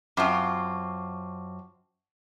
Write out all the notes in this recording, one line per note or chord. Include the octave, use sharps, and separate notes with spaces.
F#2 C4 F4 A5 C#6 D6